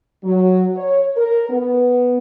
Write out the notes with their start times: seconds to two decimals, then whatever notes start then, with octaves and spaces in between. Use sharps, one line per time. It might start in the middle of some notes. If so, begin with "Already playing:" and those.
0.24 F#3
0.76 C#5
1.16 A#4
1.50 B3